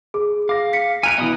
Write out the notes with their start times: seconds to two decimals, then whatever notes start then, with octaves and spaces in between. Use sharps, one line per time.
0.14 G#4 D6
0.49 F5 D6 A#6
0.73 B6 C#7
1.03 G#5 A#5 F6 F#6 D7
1.18 B2 E3 D#5 B5 D#6